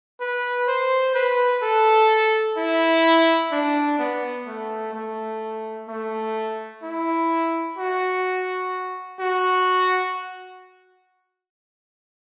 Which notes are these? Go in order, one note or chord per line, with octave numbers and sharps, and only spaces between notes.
B4
C5
B4
A4
E4
D4
B3
A3
A3
A3
E4
F#4
F#4